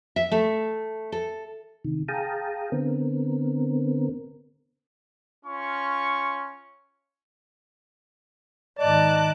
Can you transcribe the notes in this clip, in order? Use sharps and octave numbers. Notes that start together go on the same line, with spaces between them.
E5
A3
A4
C3 D#3
G#4 F5 G5 A5 A#5 D#6
D3 B3 C4 A#4
C#4 F4 C#6
G#2 D#3 D5 D#5 A5 D6 F#6